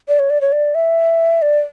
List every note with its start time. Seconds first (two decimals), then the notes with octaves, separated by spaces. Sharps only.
0.08 D5
0.19 C#5
0.30 D5
0.41 C#5
0.52 D5
0.75 E5
1.42 D5